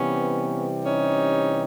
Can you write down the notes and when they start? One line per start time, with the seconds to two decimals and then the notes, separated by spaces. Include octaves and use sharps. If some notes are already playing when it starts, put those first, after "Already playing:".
Already playing: C3 E3 G3 B3 C#4
0.85 C#4 D#4